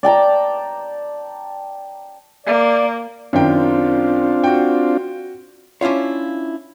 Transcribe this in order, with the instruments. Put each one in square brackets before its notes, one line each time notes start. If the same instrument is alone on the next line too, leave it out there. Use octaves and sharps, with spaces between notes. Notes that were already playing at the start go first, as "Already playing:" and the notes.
[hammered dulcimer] D5 G5 A5 A#5
[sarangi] A#3 [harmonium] D5
[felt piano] F#2 D#3 G5 [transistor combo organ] C4 D4 F4
[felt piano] F#4 G5
[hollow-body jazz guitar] C#4 D4 E4 F4 C#5